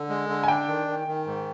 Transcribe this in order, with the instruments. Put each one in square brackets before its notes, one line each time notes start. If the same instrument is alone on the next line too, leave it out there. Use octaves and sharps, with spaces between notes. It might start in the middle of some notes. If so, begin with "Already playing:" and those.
Already playing: [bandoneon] D3
G#3
D3
[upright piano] G#5
[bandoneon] D4 [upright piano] G5
[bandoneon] D#3
D#3
D#3
G#2